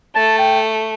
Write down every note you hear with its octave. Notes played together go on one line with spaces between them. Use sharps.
A3 A5
G5